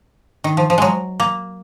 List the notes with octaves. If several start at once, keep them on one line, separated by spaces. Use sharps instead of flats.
D#3
F3
F3
F#3 G#3
A#3